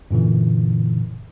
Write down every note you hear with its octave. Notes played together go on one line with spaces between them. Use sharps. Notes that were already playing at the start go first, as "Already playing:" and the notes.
F#2 A#2 D3 E3